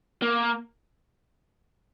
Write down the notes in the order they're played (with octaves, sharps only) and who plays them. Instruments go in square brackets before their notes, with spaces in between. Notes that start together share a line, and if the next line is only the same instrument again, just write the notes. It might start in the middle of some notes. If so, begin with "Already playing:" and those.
[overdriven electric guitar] A#3